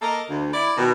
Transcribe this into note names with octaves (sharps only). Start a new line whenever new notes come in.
A#3 A4 A#4 D#5
D2
E4 D5
B2 D#3